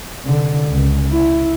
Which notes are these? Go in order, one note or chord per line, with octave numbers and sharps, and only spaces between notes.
F1 D3
C#2
E4